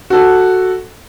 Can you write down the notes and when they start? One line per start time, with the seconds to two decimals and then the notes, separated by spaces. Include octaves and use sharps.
0.10 F#4 A4